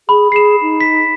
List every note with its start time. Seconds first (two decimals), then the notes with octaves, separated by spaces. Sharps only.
0.09 G#4 B5
0.32 G#4 C7 E7
0.62 D#4
0.81 B6